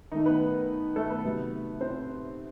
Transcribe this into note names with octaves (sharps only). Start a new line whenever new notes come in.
D#3 A3 D#4
B3 B4
A3 A4
B3 B4
C3 F#3 A3
C4 C5